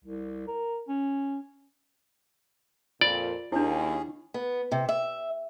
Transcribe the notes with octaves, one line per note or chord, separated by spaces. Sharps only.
C2
A#4
C#4
F2 A#2 F4 D5
D#2 C#4 D4 E4 G#4
B3
C3
E5